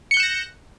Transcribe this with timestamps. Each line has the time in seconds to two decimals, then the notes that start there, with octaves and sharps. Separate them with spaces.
0.11 C#7
0.14 G6
0.17 F#6
0.20 E7
0.23 A#6